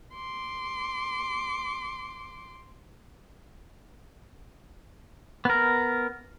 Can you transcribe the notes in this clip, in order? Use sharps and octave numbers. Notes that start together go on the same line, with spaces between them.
C6 D6
B3 A#4